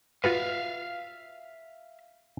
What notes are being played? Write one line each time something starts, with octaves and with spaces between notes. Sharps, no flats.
F4 F#4 B4 E5 F5